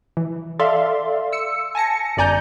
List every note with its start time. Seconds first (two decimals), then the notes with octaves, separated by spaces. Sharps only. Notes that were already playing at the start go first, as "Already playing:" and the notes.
0.17 E3
0.59 A4 D5 E5 F5 C6
1.32 E6 C#7
1.75 G#5 A5 A#6 C#7
2.17 G1 F#2 D5 G#5 A#5 G6